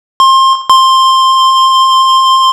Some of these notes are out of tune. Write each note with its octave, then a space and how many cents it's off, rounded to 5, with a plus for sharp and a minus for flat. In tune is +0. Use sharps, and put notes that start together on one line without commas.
C6 +25
C6 +10